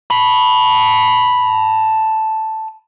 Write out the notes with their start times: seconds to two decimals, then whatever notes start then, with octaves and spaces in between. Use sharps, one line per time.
0.11 A5 B5